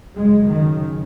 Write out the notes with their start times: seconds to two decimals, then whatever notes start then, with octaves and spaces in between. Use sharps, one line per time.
0.15 F#2 C#3 G#3
0.45 D#3